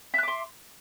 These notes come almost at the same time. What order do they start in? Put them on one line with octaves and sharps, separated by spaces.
E5 F#6 D6 C6